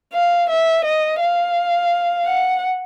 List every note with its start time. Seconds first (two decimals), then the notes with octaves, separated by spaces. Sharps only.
0.14 F5
0.49 E5
0.85 D#5
1.20 F5
2.26 F#5